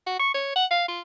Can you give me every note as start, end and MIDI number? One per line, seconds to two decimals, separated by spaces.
0.07 0.17 66
0.19 0.33 85
0.34 0.54 73
0.56 0.65 78
0.71 0.85 77
0.88 1.00 65